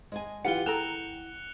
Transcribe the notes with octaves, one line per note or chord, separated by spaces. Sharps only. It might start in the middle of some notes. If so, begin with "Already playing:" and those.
G#3 D#5 G#5
E3 F4 G4 B4 F#5 C#7 G7
G#4 A4 G5 A#5 F#6 E7 F7